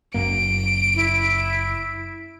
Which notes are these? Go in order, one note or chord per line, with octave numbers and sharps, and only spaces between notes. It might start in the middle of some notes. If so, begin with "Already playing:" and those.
F#1 F#2 A#3 D7
E4